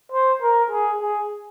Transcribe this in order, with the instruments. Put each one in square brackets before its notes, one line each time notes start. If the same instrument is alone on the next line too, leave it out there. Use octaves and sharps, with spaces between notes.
[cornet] C5
A#4
G#4
G#4